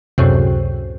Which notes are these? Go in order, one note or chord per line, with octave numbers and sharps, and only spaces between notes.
C#2 F#2 A2 C3